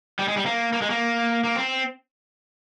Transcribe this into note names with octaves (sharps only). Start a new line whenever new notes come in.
G3
G#3
G3
A#3
A#3
G#3
A#3
A#3
C4